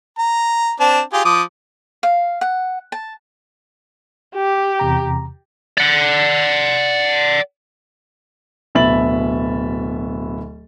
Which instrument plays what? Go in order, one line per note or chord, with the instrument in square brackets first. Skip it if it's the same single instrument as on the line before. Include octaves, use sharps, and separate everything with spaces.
[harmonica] A#5
C4 D4 A5
F4 G4 G#4
F3 D6 D#6
[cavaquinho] F5
F#5
A5
[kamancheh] G4
[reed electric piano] E2 C3 A#5
[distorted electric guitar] D5 F#5
[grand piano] D1 B2 E5 B5 A6 F#7